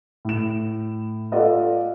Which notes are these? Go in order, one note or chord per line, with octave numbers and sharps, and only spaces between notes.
A2 E7
F4 A4 D5 D#5 F#5